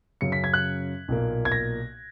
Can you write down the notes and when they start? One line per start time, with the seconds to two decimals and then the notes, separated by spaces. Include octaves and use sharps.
0.21 F#2 C#3 F#3 C#4 C#7
0.32 B6
0.44 G#6
0.54 F#6
1.08 B1 A#2 A#3
1.45 G#6
1.52 A#6